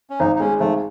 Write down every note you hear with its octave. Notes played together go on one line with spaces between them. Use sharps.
C#4
G#1 D#4
D#4
G#3 C#4
G#1 A3